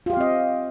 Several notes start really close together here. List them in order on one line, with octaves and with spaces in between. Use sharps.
F4 G4 F5 C4 D#5